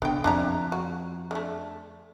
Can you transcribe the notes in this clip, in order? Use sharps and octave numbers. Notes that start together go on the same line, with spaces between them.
D3 B3 G5
F2 D4 E4 A#5
F#4
D3 A3